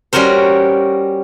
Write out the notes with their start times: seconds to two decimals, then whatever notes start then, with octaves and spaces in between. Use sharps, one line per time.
0.13 G3 C#4 F#4 A#4 C5